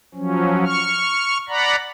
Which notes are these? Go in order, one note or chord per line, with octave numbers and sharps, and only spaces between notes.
F3 F#3 C#4
C#6 F6
D5 F#5 A#5 B5